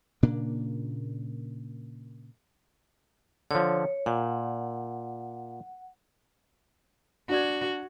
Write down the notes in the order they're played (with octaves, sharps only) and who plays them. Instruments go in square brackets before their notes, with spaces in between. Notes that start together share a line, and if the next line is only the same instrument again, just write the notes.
[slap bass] A#2 C#3 A#3 D4
[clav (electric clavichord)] D3 F3 [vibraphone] C#5
[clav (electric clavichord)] A#2 [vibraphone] F#5
[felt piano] D4 D5 G#6 [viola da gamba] F#4